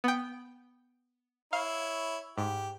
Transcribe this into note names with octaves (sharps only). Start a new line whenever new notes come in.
B3 G5
E4 C#5 F5
G#2 G4